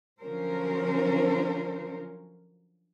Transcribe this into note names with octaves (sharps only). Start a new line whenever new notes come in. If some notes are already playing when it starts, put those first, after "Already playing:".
D3 F3 F#3 C#4 A#4 C5